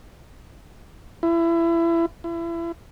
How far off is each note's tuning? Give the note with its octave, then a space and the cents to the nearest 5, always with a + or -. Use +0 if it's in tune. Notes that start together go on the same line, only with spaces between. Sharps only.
E4 +25
E4 +30